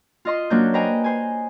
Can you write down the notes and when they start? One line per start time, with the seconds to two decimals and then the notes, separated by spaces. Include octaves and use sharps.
0.25 F4 D#5 C6
0.50 F#3 A#3 C#4 D4 C#5 G6
0.74 B4 C5 D#5 G5 G#5 A#5
1.04 C5 G#5